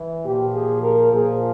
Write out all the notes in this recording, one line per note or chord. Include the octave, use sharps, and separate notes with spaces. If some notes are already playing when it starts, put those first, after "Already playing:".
Already playing: E3
A#2 F3 G4
G#4
A#4
A#2 F3 G#4